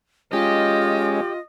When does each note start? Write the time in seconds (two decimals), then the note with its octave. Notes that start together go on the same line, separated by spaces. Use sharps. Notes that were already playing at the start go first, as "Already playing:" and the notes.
0.33 G#3 C#4 F4 G4 D#5